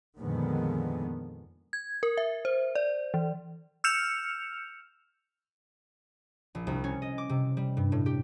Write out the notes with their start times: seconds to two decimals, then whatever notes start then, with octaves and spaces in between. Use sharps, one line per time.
0.19 F2 A#2 D3 D#3 G#3 B3
1.73 G#6
2.03 A#4
2.18 E5
2.45 C5
2.75 D5
3.14 E3
3.84 E6 F6 G6 C#7 E7 F7
6.55 A#1
6.67 C2
6.84 C#4
7.02 D#5
7.18 D6
7.29 C3
7.57 G3
7.77 G2
7.92 A2
8.06 G4